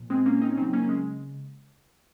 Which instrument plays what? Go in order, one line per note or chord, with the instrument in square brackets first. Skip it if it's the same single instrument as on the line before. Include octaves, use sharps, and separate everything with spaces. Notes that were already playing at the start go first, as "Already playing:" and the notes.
Already playing: [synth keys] A#2 F3
G#3 C4
A#3 C#4
C4 D#4
C#4
C#3 F#3 C4 D#4
A#3 C#4
G#3